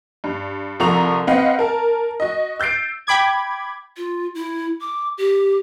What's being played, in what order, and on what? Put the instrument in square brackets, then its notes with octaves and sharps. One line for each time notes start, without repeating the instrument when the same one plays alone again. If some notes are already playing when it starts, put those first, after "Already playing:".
[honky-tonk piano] G2
C2 F3 A4 A#5 C#6 F7
C4 B4 D#5 F5 F#5
A#4 A5
F#4 D#5
E6 G6 A6 C7 D7
[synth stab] G5 B5 D6 G#6
[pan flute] F4
E4
D6
G4